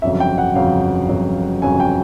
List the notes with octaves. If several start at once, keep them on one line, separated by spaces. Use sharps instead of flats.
G1 F2 C#3 F#3 E5
G5
F#5
G1 F2 C#3 F#3 F5
G1 F2 C#3 F#3
G1 F2 C#3 F#3 G#5
G5